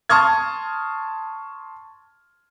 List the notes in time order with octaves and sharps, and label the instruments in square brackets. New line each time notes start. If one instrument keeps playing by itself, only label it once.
[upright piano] A5 C6 C#6 D#6 F6 G#6